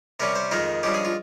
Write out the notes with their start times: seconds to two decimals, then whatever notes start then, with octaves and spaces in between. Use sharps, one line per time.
0.20 C3 G3 C#4 A#4
0.36 C5
0.51 F2 D#3 G#3 A#4
0.83 G2 F3 G#3 C#4 G4
0.94 G#4
1.05 F4